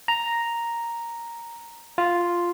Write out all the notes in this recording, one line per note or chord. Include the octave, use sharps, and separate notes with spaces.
A#5
F4